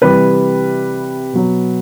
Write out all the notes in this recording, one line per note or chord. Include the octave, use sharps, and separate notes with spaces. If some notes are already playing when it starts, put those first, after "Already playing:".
C3 E3 G3 B4
B2 F#3